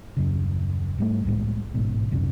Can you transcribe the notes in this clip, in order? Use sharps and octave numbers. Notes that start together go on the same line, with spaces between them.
D#1 F#2 C#3
G#2 G3 A3
C2 A2 G#3
A1 G#2 B2
C#2 F#2 C3